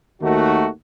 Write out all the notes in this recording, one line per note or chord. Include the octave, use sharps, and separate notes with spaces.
D#2 D#3 A3 D#4 F#4